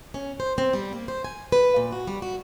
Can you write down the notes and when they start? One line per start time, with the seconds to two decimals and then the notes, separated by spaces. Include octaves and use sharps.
0.14 C#4
0.40 C5
0.58 C4
0.73 G3
0.93 A#3
1.08 C5
1.25 G#5
1.52 B4
1.76 A#2
1.92 F#4
2.07 G3
2.22 F#4